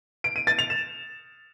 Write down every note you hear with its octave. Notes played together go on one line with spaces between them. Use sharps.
D7
D#7
A6
F7
E7